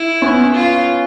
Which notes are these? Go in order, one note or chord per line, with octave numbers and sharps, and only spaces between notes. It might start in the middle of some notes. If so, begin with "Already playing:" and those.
Already playing: E4
B3 C#4
F4